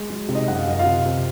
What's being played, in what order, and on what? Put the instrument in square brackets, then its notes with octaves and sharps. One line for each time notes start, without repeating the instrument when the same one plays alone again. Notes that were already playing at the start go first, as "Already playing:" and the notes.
Already playing: [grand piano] G#3
F#3
C3
D#4 D#5
F#2 F#5
F5
F#2 D#5
F4 F5
C3
C3